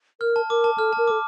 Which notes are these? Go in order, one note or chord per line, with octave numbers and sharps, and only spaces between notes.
A#4 F6
A5
A#4 D6
A5
A4 F6
A5
A#4
A4 D6